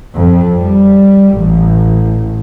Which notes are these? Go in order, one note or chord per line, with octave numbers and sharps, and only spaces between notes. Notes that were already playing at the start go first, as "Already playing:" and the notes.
F2
G3
A1